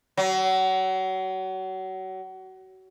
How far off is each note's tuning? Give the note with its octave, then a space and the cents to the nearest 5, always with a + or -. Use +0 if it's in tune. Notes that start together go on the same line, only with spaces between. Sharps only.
F#3 +30